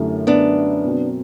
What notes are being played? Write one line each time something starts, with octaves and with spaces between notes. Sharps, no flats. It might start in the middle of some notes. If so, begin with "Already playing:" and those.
Already playing: F#2 D3 A3 E4 G4
B3 D4
B2 F#3 C4